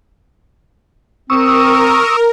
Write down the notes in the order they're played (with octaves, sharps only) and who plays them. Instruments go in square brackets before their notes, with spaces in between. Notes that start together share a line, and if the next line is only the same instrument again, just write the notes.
[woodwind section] C4 [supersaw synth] A#4 [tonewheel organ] C#6 D#6 E6